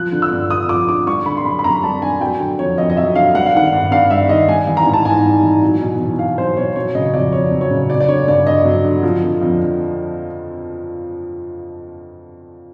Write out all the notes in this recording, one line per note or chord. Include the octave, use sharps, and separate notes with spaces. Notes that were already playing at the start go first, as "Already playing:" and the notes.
Already playing: F3 F#6
D3
E6
G2
G2 D#6
F3 D6
D3 D6
G3 C#6
D3 B5
C6
F#2 B5
B5
F#2 A#5
G3 A5
D3 G#5
F#3 G5
D3
F2 C#5
F2 D#5
D#5
F#3 E5
D3 F5
G3 F#5
F5
D#3 F#5
G2
G2 F5
G3 E5
D#3 D#5
G3 G#5
E3
A#5
G#2
A5
G#2 G#5
G3
E3
F#3
B2
E2
E2 F5
F#3 C5
B2 C#5
F#3 C#5
C#3 D#5
F2 D5
F2 C#5
F#3
C#5
C#3
F#3 D5
D5
D3 C#5
G2 D5
G2 D#5
F#3
D3
F3
D3
F2